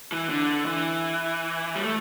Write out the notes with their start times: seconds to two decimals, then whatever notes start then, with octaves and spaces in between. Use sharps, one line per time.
0.12 E3
0.29 D3
0.66 E3
1.75 G3
1.84 A3